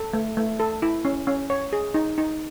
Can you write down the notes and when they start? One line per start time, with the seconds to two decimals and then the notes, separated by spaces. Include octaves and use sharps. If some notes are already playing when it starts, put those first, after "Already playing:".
Already playing: A4
0.13 A3
0.37 A3
0.60 A4
0.82 E4
1.05 C#4
1.27 C#4
1.50 C#5
1.73 G#4
1.94 D#4
2.18 D#4